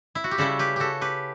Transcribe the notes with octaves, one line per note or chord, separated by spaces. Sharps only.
E4
F#4
G4
C#3 G3 C#4 E4 F#4 A4
G4 B4
F#4 G4 A4
G4 B4